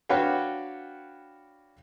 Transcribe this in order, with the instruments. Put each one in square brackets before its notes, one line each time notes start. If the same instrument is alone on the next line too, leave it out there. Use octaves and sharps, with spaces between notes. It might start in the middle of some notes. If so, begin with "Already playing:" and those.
[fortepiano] D4 F#4 B4 C#5 F5 G5